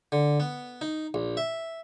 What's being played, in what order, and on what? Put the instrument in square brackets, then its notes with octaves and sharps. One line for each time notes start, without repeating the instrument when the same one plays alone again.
[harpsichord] D3
B3
D#4
A#1
E5